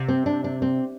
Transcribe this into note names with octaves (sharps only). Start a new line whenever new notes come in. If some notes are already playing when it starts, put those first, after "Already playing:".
Already playing: C3
C4
D4
D4
C4